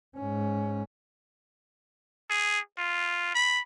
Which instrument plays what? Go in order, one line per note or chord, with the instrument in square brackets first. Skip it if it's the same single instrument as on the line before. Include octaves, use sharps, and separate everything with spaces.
[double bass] G#2 C#4
[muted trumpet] G#4
F4
B5